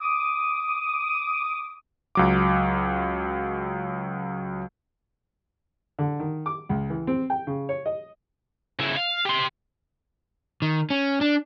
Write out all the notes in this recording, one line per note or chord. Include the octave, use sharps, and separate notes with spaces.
D6 D#6
C#2 F#3 D6
D3
D#3
D6
C#2
E3
C4
G5
C#3
C#5
D#5
C#3 E4
F5
G4 C6
D#3
C#4
D4